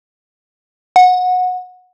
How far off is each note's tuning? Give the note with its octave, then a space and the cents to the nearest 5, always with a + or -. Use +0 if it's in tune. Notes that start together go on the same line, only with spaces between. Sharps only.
F#5 -20